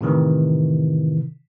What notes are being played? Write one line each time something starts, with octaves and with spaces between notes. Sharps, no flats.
A2 C3 D#3 E3